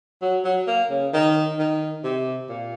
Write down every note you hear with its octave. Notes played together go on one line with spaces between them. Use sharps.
F#3
F#3
A#3
C#3
D#3
D#3
C3
A#2